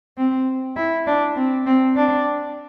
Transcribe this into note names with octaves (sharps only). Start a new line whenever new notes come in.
C4
E4
D4
C4
C4
D4